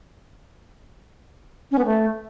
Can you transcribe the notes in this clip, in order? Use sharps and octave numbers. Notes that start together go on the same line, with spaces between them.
C#4
B3
A3